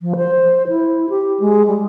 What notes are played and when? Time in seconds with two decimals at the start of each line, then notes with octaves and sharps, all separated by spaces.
0.01 F3
0.16 C5
0.68 E4
1.10 G4
1.40 G#3
1.68 G3